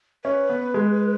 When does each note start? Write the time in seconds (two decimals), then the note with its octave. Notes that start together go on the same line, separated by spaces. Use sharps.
0.25 C#4 B4
0.49 B3
0.74 G#3